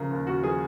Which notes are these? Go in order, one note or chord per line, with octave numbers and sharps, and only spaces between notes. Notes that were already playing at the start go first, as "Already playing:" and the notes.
Already playing: C#3 F3 A#4
D#2
D#2 F#4
F3 G#4